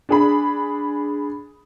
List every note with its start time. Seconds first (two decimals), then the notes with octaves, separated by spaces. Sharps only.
0.09 D4 G#4 B5